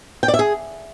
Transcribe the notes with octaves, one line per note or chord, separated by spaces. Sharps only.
G5
D5
E5
G#4